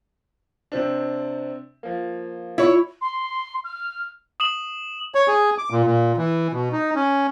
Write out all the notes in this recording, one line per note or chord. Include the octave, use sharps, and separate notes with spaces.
C3 C4 D4
F3 A#3
E4 F4 C#5
C6
F6
D#6 E7 F#7
C#5
G#4
D6
A#2
A#2
E3
B2
D#4
C#4